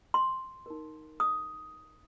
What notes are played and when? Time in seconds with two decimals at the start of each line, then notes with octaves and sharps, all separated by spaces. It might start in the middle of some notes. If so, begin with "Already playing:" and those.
0.14 C6
0.66 D#4 A#4
1.20 D#6